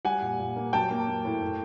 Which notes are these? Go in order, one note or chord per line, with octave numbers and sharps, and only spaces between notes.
G3 F#5 G#5
A#2
A#2
A#3
F#3 G5 A5
A#3
A#3
A2
A2